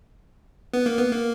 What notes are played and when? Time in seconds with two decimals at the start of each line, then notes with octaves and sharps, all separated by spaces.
0.73 B3
0.86 A#3
0.98 B3
1.11 A#3